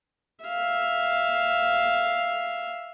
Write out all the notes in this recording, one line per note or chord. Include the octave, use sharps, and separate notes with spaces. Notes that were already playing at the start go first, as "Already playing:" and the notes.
E5 F5